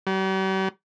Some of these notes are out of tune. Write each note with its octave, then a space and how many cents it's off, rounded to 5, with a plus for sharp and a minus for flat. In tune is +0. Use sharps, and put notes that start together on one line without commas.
G3 -45